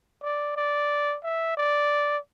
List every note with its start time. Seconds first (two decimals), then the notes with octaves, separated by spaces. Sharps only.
0.23 D5
0.56 D5
1.24 E5
1.57 D5